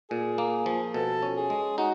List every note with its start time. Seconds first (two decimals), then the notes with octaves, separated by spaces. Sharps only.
0.10 A#2 G#4
0.38 A#3
0.66 F3
0.94 B2 A4
1.23 C#4
1.37 G#4
1.50 G#3
1.78 D#4 F#4